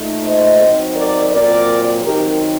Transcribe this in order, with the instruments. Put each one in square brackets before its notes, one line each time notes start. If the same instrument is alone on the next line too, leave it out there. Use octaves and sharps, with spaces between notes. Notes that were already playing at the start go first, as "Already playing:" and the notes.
Already playing: [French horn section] A#2 A3 D#4
C5 D#5
F#3 C4 D#4
A#4 D5
A#2 F#3 C4 A#4 D5
D#3 F#3 C4 D#4 G4 A#4